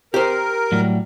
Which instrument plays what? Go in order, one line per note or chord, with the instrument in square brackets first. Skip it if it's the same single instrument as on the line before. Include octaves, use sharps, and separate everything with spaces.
[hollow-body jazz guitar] G4 C5 [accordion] A#4
[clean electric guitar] A2 F#3 G3